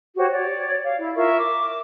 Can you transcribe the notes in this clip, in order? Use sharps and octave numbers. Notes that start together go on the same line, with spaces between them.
F#4 G4 C5 C#5
C#5 D5
F5
E4
F4 A#4 E5 C#6
D6